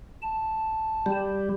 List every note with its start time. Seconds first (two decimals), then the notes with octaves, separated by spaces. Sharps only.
0.22 A5
1.06 G3